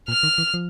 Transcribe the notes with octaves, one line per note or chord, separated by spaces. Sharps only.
A#2 F6
D#3
E3
F3